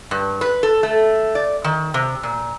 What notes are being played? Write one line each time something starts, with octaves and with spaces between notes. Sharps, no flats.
G2
B4
A4
A3
D5
D#3
C3
A#2